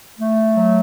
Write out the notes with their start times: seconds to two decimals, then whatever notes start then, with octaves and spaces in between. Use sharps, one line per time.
0.19 A3
0.55 F#3